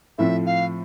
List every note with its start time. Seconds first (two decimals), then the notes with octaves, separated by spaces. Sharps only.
0.18 A2 F3 C4 E5
0.46 F5